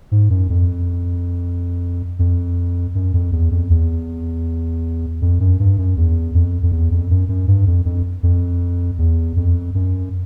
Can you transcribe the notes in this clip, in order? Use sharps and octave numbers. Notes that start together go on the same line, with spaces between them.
G#2
F#2
F2
F2
F#2
F2
E2
F2
E2
F2
F#2
G2
F#2
E2
F2
F2
E2
F2
F#2
F#2
G2
F2
F2
F2
E2
F2
F#2